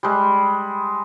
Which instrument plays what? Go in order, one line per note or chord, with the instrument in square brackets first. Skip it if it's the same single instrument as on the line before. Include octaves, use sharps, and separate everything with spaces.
[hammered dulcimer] G3 G#3